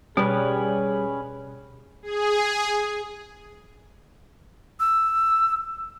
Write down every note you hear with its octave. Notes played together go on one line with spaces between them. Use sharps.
B2 G3 C#4 G#4 B4 C#5
G#4
E6